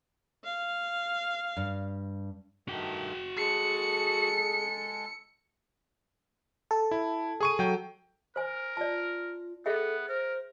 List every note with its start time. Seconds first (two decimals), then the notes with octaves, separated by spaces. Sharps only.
0.44 F5
1.57 G2
2.68 G2 D#3 A3 F#4 G5
3.38 G#3 G#4 A4 C#7
6.71 A4
6.91 E4
7.40 G#4 C#6 D#7
7.59 F#3 G5
8.36 A#4 C5 G#5
8.77 F4 D5 A5
9.66 B3 G#4 A4 E5 G5
10.09 A#4 C5